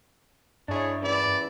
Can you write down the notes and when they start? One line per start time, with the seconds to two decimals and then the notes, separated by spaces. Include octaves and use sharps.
0.68 G2 D4 E4 G#4 C#5
1.02 C#3 E3 E4 D5